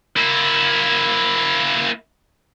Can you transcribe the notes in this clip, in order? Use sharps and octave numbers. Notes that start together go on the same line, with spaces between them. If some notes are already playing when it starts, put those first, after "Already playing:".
A#3 E4